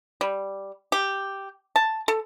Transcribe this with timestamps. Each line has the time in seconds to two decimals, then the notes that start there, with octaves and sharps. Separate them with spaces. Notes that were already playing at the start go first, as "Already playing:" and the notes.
0.21 G3
0.92 G4
1.76 A5
2.08 A4